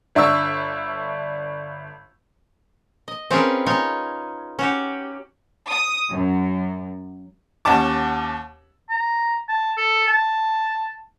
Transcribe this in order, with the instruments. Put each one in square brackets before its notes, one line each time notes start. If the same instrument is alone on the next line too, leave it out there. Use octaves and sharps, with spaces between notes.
[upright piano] G1 D4 E5 C#6 E6
[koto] D#5
C4 C#4 F4 G#4 A#4 B4
D#4 F4 C#5 G#5
C#4 F#4 G4
[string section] D#6
F#2
[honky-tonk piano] D#2 C#4 F#5 A5 D6
[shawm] A#5
A5
A4
A5